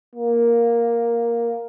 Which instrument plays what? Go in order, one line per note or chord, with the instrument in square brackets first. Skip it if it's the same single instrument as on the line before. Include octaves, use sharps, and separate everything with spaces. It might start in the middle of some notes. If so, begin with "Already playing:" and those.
[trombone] A#3